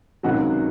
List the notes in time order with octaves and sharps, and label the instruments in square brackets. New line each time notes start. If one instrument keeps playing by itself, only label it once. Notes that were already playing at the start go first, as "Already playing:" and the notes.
[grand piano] C#2 C3 D#3 G#3 [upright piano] F#3 F#4